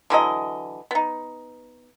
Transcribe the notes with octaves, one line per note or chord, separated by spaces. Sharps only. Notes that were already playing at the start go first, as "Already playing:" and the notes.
D3 E3 F#3 D#5
B3 D#4